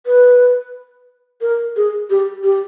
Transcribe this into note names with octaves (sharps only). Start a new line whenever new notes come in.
B4
A#4
G#4
G4
G4